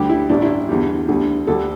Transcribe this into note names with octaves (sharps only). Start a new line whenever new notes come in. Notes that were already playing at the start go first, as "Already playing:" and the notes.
Already playing: D2 D3 G3 G4
E4
A1 G2 E3 D4
E4
E2 D3 G3
D2 D3 G3
D2 D3 G3 A4